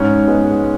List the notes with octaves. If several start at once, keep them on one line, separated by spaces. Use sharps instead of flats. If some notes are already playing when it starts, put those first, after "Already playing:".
Already playing: G#2 C#4
G#3 B3